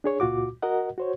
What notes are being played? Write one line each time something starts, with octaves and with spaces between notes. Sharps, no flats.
D4 G#4 C#5
C#2 A#2 F4 F#4 D6
F#4 A#4 D#5 F#5
F#4 C5 C#5